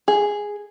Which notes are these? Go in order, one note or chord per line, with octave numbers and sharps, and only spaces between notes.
G#4